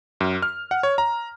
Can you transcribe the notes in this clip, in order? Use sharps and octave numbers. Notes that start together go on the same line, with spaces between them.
F#2
F6
F#5
C#5
A#5